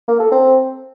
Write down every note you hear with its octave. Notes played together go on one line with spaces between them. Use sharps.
A#3
A4
C4